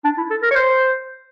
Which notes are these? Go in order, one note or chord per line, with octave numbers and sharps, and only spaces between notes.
D4
E4
A4
A#4
C#5
C5